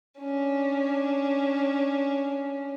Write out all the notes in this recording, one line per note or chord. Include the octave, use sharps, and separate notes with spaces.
C#4 D4